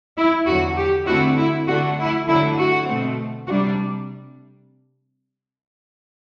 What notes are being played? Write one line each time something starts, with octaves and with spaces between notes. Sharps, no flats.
E4
E2 D3 F#3 F#4
G4
D3 A3 C4 E4 F#4
E4
D3 A3 D4 F#4
E4
D3 F#3 A3 E4
F#4
B2 A3 C4
C3 G3 D4 F#4